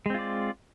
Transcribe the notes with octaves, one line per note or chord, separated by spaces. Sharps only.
G#3 C4 F4 D5